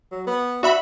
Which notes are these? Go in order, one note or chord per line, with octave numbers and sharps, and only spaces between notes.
F#3
B3
D4 F#4 E5 B5